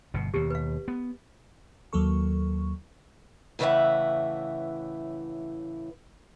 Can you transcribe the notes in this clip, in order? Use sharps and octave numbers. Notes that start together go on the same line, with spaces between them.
G1 B2
D#2 B2 G4
B4 F5
B3
D#2 F#3 A#3 A4 C#6
A2 C#3 E3 C#5 E5 F#5